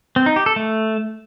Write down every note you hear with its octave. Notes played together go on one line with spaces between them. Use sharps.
C4
D#4
G4
A4
A3